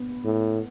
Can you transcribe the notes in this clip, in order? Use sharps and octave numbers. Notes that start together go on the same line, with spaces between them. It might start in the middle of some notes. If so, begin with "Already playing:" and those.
Already playing: B3
A2